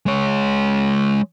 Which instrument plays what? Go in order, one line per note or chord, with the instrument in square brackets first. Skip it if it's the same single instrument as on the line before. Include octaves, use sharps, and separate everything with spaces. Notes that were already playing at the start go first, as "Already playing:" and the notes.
[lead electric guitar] G#3 C#5